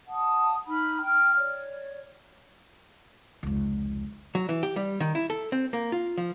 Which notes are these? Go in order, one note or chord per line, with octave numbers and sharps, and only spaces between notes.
F#5 A5 D#6
D#4 B5 F6
G5 F6
C#5 D5
F1 C#2
F#3
E3
G4
G3
D#3
E4
A4
C4
A#3
F4
F3